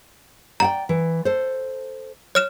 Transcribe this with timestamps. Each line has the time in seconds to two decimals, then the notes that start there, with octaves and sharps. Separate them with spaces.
0.60 D5 F#5 G5 A#5
0.89 E3
1.25 A4 C5
2.35 C#5 F6 E7